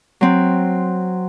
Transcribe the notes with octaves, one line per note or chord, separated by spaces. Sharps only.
F#3 C4